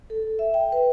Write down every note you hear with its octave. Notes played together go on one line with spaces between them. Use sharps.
A4
E5
G5
B4